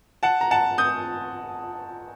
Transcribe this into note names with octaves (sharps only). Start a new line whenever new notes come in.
F#5 A5
A#5
F#5 A5
D#6 G6